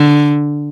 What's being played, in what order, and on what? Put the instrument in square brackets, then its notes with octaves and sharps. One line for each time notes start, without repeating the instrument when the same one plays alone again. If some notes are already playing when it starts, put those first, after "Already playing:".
Already playing: [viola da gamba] D3